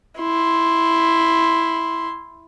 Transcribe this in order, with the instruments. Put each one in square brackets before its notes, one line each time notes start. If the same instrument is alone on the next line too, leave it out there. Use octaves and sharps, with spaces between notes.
[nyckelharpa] E4 C6